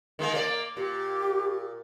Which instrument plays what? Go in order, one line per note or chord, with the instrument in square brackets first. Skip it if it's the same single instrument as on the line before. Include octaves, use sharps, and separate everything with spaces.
[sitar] D#3 G#3 A#3
A#3 D5
[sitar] A#2 [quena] G4